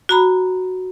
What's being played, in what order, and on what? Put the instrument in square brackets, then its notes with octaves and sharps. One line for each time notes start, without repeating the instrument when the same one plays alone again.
[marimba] F#4 A#5 B5